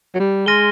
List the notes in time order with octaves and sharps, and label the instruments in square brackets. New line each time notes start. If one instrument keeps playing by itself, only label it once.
[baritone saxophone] F#3
G3
[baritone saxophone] G#3 [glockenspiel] C6 F6 A#6 D#7 G7